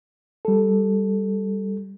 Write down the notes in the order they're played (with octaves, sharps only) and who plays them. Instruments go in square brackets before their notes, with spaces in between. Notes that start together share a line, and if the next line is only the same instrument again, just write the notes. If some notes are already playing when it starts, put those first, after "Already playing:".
[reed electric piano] G3 A4